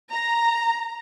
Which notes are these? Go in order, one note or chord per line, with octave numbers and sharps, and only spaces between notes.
A#5